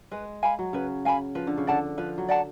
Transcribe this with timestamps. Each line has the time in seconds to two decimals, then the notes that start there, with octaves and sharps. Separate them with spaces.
0.11 G#3 B4
0.43 F5 G#5 B5
0.59 F#3
0.73 C#3 B4
1.05 F5 G#5 B5
1.35 F3 B4
1.47 D3
1.58 C#3
1.67 D3 D5 F#5 A5
1.98 F3 B4
2.18 F#3
2.28 D5 F#5 A5